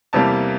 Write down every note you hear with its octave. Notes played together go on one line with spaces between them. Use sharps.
E2 C3 G3 A#3 A5